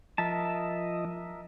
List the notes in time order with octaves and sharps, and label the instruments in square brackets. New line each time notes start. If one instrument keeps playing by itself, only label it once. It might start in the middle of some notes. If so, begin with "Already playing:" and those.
[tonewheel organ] F3 D#5 [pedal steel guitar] A#4 E5 A5